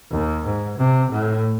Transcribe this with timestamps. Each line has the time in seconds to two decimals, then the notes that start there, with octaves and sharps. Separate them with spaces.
0.11 D#2
0.45 G#2
0.78 C3
1.11 A2